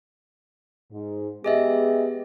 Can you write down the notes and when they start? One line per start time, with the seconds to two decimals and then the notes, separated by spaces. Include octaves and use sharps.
0.92 G#2
1.44 G#3 B3 G4 G#4 D#5 E5